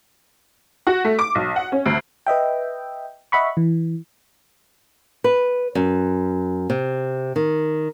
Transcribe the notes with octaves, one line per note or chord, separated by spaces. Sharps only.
F#4
A3
D6
B1
F#5
C#4
D2
B4 D#5 E5 G5
D#5 E5 F#5 B5 C#6
E3
B4
F#2
C3
D#3